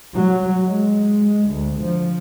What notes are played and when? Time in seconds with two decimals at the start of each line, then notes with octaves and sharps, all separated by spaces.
0.16 F#3
0.65 G#3
1.49 D2
1.81 F3